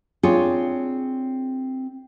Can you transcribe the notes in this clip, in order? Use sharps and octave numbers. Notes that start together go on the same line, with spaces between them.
C4 D4 F4 G#4 C#5